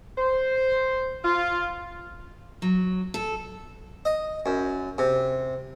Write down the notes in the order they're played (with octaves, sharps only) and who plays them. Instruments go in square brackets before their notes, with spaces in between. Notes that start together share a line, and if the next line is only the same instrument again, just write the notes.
[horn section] C5
F4
[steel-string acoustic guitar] F#3
A4
[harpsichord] D#5
F#2
C3